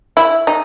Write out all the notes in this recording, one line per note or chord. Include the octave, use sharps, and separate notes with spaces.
E4
D#4